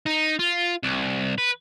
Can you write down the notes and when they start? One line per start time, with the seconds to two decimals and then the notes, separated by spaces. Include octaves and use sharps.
0.06 D#4
0.39 F4
0.83 C2
1.38 B4